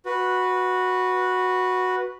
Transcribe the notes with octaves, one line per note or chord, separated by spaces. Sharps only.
F#4 B4